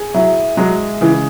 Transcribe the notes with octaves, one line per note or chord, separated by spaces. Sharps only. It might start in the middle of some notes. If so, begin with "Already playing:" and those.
Already playing: G#4
F#3 E4
F#3 G#3
C#3 E3